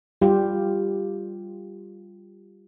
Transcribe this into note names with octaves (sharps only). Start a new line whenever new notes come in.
G3 F4 G4